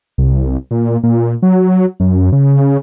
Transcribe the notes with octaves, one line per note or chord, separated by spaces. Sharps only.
C2
A#2
A#2
F#3
F#2
C#3